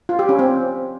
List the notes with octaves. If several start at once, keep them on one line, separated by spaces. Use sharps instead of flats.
F4
G4
C#4
C4